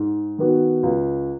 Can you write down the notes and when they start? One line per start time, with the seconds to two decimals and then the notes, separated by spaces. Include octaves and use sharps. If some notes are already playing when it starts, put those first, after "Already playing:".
Already playing: G#2
0.38 D#3 B3 F#4
0.83 C#2